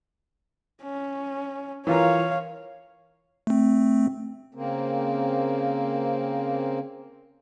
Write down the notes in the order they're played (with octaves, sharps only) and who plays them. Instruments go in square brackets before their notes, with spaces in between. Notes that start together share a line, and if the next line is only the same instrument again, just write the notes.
[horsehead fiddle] C#4
[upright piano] E3 F4 A#4 [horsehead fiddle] C#5 F5
[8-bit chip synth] A3 C4
[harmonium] C#3 A#3 C4